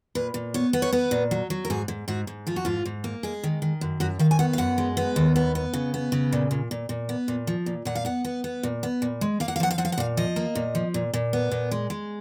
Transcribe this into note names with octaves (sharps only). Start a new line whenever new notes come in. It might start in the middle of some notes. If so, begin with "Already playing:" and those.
A#2 B4
A#2
B3 C#5
B3
C#5
B3 B4
A#2
F#3
F#3
A#4
G#2 G#4
G#2
G#2 F#4
G#2
F3 F4
F#4
G#2 F4
G#2
A#3
G#3 G#4
D#3
D#3
F#2
F#2 F#4
D#3 F5
G#5
B3 F#5
F5
F#2 F#5
G#3
B3
D#2
B3
B3
C#3
B3
C#3
A#2
A#2
A#2
A#2
B3
A#2
F3
A#2
A#2 F#5
F5
B3 F#5
B3
B3
A#2
B3
A#2
G#3
A#3 F5
F#5
F5
F3 F#5
F5
F3 F#5
F5
F#5
A#2 F5
F3 D#5
A#3
A#2
F3
A#2
A#2
B3
A#2
G#3
G#3